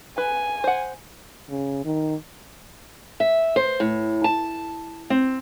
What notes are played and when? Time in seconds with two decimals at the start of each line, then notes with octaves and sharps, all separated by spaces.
0.18 B4 G#5
0.64 C5 F#5
1.50 C#3
1.85 D#3
3.20 E5
3.56 C5
3.80 A2
4.24 A5
5.10 C4